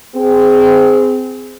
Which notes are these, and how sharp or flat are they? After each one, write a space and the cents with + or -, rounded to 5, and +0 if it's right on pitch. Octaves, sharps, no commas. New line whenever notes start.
C4 -25 G#4 +0